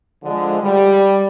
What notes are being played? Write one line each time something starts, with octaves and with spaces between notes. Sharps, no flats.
D3 F3 G#3
G3